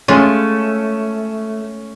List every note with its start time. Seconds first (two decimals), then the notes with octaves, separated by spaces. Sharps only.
0.08 G#3 A3 C#4 F4